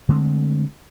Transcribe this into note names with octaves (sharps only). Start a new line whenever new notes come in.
D3 G#3 A3 C4